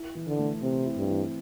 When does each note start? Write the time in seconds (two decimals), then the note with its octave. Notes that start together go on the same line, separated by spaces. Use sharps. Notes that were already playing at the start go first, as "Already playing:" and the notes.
Already playing: E4
0.15 E3
0.26 D3
0.39 A3
0.62 C3 C4
0.85 E4
0.97 G2
1.09 E3